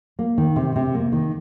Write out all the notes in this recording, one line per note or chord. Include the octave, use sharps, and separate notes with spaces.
A#3
D#3
C3
C3
A#3
D#3